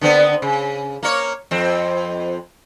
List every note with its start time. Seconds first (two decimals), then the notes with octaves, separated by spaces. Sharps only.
0.01 D3 B3 C4
0.42 C#3
1.03 A#3 C#5
1.51 F2 C4